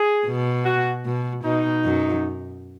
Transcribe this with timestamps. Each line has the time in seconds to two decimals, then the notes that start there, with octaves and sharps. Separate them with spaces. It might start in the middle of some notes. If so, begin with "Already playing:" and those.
Already playing: G#4
0.26 B2
0.65 F#4
1.05 B2
1.44 B2 D#4
1.85 F#2